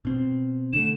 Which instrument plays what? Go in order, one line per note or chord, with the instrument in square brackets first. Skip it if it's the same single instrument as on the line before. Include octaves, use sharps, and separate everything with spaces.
[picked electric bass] B2 C4
[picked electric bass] D3 A3 [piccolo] E7